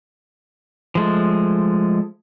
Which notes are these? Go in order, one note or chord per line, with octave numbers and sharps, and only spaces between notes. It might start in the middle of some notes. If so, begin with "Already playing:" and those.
F3 G#3 A3